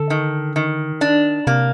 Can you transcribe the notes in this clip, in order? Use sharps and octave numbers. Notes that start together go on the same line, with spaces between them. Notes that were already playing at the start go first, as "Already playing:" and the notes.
Already playing: D3 A4
D#3
D#3
D4
C3 A#3